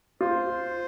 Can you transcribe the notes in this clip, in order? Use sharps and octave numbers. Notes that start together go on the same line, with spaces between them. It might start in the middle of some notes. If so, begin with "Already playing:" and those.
F4 C5